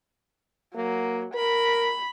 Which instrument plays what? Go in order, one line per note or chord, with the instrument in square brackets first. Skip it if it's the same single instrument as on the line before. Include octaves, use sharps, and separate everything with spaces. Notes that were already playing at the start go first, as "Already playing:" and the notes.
[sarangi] F#3 [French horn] A#3
[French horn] A#4 [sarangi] B5